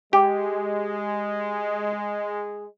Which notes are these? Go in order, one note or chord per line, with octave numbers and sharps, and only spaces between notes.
G#3 G4